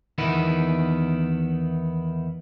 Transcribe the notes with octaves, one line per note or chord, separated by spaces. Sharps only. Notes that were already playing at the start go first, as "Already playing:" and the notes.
E2 D#3 B3 E4